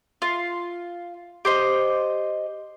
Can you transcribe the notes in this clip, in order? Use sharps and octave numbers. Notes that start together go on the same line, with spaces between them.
F4
G4 C5 D#5